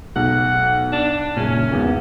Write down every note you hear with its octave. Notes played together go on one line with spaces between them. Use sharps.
B1 F#5
D4
F#1 A#2 C#4
G#1 E2